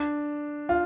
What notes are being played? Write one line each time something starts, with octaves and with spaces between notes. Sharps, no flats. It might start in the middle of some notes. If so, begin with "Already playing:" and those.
Already playing: D4
F4